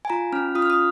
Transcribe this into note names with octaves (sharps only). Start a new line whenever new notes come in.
G#5
F4 A#5
C#4 F6
F4 D#6
F6
D#6